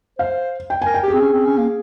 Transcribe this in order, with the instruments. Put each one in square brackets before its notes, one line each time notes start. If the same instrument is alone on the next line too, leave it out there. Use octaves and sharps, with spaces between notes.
[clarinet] C5 [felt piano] F5
[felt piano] G5
G#5
[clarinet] A#4
[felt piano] G5
[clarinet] G4 [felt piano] G#4
[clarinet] C4
C#4
C4
C#4
A#3